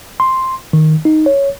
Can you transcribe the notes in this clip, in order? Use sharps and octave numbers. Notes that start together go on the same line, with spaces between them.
C6
D#3
D#4
C#5